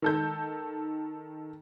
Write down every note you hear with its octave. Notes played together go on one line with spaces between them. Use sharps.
D#3 A4 G6